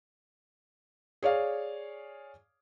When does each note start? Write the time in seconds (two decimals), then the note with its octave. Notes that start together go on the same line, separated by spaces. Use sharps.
1.23 G#4 C#5 D5 F5